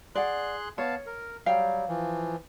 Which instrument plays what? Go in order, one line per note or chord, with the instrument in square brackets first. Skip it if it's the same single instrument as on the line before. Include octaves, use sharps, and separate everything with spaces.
[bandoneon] G#4 C6 F#6 [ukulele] D5 F#5
[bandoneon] B3 F5 A5 [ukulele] C#5
[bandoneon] A#4
[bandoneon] F#3 G3 [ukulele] F5 G5
[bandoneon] E3 F3